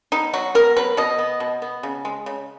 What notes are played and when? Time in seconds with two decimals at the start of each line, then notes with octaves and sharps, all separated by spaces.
0.12 B3 D#4
0.33 F#3 F#4
0.55 B3 A#4
0.77 F#3 B4
0.97 B2 D#5
1.18 B3
1.40 B2
1.62 B3
1.83 C#3
2.05 G#3
2.26 C#3